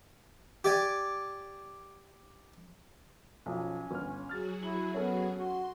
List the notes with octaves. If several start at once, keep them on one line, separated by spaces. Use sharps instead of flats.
G4 D5 G#5
B1 F3 C#4
G1 F6
F#3 F#4 G#4 F6 A6
E4 F#7
B3 C#4 A4
F#4 C6